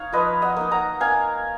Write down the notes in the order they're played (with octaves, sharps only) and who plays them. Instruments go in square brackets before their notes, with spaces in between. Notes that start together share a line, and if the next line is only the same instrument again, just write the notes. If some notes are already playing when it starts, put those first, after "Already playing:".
Already playing: [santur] D#4 C#5 F5
F3 B4 D#5
D#5 F#5
A#3 D#4
F#5 A#5
A#3 F5 G#5